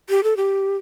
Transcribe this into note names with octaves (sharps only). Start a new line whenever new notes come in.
G4
A4
G4